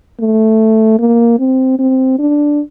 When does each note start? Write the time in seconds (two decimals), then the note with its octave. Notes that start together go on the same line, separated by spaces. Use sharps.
0.20 A3
0.99 A#3
1.39 C4
1.79 C4
2.19 D4